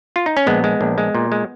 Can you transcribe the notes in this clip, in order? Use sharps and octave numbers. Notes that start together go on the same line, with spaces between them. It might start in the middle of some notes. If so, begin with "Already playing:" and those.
F4
D#4
C#4
A#1 G#3 B3
G#3
A#1
G#3
A#2
G#3